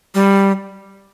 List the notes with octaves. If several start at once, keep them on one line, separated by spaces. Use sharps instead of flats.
G3